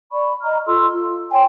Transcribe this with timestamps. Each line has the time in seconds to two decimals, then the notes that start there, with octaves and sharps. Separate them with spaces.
0.12 D5 B5 C#6
0.43 D#5 A#5 F6
0.66 F4 A4 C6 E6
0.92 F4
1.32 C#5 G5 G#5 C6